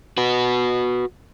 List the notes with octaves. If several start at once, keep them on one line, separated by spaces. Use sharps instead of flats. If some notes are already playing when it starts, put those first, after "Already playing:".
F#4 B4